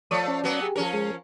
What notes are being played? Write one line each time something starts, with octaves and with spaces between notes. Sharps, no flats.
F3 A3 C#5 D5 D#6
C#4 D5
F#3 A#3 B3
G4 G#4
F3 C#4 A#4
G#3 G#4